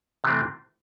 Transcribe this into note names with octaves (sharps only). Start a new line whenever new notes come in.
C3 E3 A3 C4